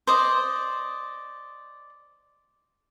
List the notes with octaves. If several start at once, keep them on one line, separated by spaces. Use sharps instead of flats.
C5 D5 D#5